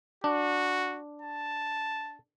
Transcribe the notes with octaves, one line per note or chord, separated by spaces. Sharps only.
D4 F#4
A5